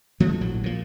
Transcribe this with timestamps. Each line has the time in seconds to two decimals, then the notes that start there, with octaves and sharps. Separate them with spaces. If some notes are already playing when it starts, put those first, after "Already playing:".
0.20 F3 G3 A3
0.41 A#1 A2 F#3
0.64 A#2 F3